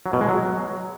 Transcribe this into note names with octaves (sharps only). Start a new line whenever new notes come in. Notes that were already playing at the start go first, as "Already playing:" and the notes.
F#3
B2
G#3
F#3